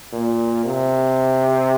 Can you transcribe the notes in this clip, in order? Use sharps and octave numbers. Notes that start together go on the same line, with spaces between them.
A#2
C3